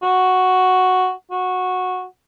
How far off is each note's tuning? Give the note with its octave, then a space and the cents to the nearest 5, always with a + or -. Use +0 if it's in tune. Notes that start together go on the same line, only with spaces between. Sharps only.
F#4 +0
F#4 -10